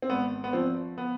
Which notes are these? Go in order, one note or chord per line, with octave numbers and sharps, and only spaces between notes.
C4
G#1 B3
B3
F3 C4
B3